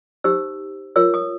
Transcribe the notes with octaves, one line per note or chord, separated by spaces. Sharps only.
D#4 G4 C5 E6
F4 A#4 C#5 E6
D#6